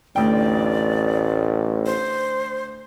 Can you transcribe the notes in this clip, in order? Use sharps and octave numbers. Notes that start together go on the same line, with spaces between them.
A1 D2 D5 G5
C5